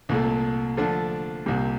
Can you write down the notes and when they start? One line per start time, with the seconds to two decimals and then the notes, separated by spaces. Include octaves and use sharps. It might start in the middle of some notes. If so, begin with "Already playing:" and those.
0.09 C2 A#2 A3
0.77 D3 F3 A3 D4
1.46 C2 A#2 G3